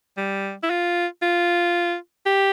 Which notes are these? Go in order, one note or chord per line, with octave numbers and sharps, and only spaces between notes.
G3
E4
F4
F4
G4